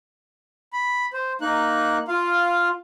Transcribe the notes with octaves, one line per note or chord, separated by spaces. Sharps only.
B5
C5
A#3 D#4 F#6
F4 F5